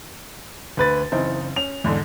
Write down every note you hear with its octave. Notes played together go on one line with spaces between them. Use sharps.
D2 B4 A6
F#1 E3 C4 D#4
C#4 F7
E2 G#2 D3